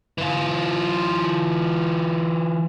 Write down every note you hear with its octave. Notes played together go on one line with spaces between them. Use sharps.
E3 F4